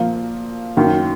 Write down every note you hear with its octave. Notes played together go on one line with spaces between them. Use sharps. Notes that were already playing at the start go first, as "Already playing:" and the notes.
Already playing: A#2 F3 A#3
F#2 D#3 F#3 A#3